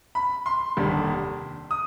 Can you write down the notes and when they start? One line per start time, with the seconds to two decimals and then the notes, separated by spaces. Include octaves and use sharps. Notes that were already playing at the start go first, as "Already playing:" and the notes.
0.15 B5
0.46 C6
0.77 F1 D#2 D3 G3
1.71 D#6